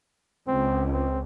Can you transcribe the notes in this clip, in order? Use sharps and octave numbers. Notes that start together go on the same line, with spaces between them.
C#2 C4
C4